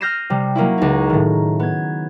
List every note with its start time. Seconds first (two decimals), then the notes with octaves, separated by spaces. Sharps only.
0.01 F6 G6 A#6 C7 D#7 E7
0.30 C3 G3
0.55 F#3 A#3 C#4 E4
0.78 C#2 D#4
1.10 A2 D#3
1.60 B3 G#6